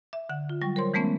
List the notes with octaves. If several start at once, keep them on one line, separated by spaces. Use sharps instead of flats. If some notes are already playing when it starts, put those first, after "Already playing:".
E5
D3 F#5
F4
F#3 G3 G5 C#6
A#4 C5 C#5 C6
E3 G#3 A3 B3 C#4